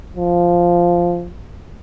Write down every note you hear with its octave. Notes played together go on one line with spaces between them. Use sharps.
F3